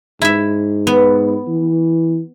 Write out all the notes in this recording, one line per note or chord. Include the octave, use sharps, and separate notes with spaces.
G#2 E4 E5
B3
E3